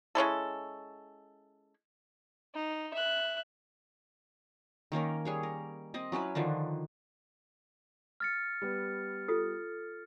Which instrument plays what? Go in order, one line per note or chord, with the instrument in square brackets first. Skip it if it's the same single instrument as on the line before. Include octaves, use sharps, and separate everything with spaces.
[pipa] G#3 C#4 E4 A4
[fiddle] D#4
E5 F#6
[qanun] D#3 A#3 C#4 A#4
G3 G#4 C#5
A#4
C4 D#5
F#3 C#4 E4 B4
D3 D#3 F3 D4
[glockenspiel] F6 A6 C#7
[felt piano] G3 B3
[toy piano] F4 A4 D#6